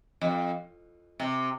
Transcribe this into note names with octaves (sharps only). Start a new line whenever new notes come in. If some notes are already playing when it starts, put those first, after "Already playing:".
F2
C3